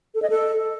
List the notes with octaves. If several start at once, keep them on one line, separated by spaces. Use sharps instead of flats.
A4
D#5
A4